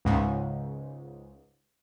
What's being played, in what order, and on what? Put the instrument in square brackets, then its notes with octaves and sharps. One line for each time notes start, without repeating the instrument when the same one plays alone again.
[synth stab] C#2 G#2